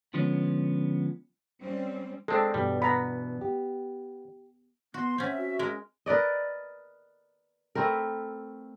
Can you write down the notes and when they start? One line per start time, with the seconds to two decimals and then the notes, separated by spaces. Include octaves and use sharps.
0.14 D3 F3 G#3 B3 C#4
1.60 G3 C4 C#4
2.28 G#3 C4 D4 A4
2.54 G2 B2 E3 G3
2.82 B3 A#5 B5
3.41 G4
4.94 B3 F#4 C6
5.18 C4 C#4 E5 F#5
5.37 F#4
5.59 G#3 A#4
6.06 A#4 B4 D5 D#5
7.75 A3 C4 E4 A#4